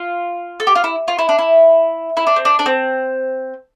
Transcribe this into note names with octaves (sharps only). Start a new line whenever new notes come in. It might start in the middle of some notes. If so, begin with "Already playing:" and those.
Already playing: F4
A4
G4
F4
E4
F4
E4
D4
E4
E4
D4
C4
D4
D4
C4